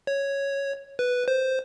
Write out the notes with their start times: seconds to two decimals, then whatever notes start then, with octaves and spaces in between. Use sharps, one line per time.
0.07 C#5
0.99 B4
1.28 C5